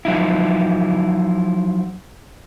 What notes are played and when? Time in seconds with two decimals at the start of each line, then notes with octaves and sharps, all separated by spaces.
0.05 F3 F#3 D#4 E4